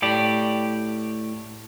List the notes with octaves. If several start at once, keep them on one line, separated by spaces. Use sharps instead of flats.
A2 G4 D5